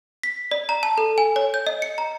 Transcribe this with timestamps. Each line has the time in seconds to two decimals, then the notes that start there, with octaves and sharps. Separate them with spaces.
0.23 B6
0.51 D5
0.69 A#5
0.83 A5
0.98 A4
1.18 G#5
1.36 C#5
1.54 G6
1.67 D#5
1.82 C#7
1.98 A#5